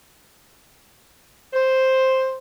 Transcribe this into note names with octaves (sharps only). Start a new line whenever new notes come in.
C5